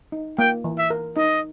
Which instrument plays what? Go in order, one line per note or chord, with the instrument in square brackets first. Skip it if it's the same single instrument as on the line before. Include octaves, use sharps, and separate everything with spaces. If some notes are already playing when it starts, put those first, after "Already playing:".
[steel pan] D#4
[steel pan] A#3 [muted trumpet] G5
[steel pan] E3
[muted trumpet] E5
[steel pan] A#4
[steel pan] D#4 [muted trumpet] D#5